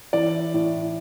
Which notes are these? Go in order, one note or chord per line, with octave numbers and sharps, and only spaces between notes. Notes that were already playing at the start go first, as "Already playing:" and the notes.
E3 D5
A2